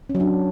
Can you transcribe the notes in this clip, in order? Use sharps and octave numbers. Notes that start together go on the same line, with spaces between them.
C#4
F#3
D4